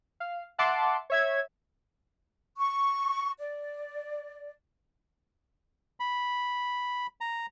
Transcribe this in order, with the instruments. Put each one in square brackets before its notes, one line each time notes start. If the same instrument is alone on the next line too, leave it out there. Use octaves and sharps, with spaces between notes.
[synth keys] F5
E5 F#5 A5 C6 D6
C#5 E5 G#6
[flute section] C#6
D5
[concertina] B5
A#5